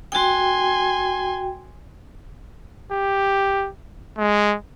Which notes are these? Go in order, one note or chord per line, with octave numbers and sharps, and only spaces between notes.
F#4 G5 G#5 C6
G4
G#3